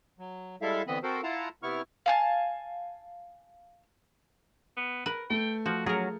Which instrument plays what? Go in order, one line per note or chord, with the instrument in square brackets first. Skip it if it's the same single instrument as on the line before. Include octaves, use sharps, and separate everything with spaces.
[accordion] F#3
G3 G#3 E4 A4 E5 F5
D3 E3 B3 C4 D#5 B5
C4 F#4 A4 A#4 C5
E4 F4 F5 F#5 A5 A#5
C3 B3 E4 C#6 F6
[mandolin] F5 G#5 A5
[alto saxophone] B3
[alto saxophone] A#4 [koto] B4
[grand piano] A3 [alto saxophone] G5
[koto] F3 [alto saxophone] F#4
[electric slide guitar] F#3 [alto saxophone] C#4 [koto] G#4 A#4